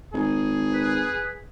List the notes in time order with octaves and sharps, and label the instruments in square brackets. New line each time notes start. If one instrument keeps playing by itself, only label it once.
[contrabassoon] G#1 [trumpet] G#4
[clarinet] B4